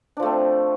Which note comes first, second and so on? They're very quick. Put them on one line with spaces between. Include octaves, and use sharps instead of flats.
D4 F3 A3 C4